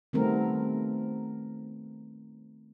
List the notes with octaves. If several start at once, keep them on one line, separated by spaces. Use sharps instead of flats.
D#3 G3 A3 B3 C4 A#4